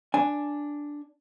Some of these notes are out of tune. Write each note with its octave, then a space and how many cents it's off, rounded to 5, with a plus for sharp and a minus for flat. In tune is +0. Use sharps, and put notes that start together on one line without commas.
D4 +0 G#5 +0